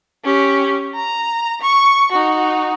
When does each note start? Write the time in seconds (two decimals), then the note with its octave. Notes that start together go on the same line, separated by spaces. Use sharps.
0.24 C#4 G4
0.94 A#5
1.61 C#6
2.12 D#4 F#4